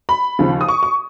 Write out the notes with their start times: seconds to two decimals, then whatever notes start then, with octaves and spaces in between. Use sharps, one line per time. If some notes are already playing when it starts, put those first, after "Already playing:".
0.09 B5
0.39 D#2 C#3 F3
0.61 D#6
0.68 C#6
0.83 C#6